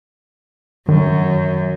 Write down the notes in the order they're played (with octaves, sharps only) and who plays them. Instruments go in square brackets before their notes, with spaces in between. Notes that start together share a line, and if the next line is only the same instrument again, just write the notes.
[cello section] F#2 [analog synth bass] D#3